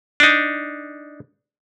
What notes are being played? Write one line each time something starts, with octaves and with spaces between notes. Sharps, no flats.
D4 D#4